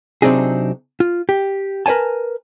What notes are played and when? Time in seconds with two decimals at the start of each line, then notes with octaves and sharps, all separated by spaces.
0.22 C3 F#3 C4 D4 D#4 G#4
1.00 F4
1.29 G4
1.86 A#4 B4 C#5 G#5 A5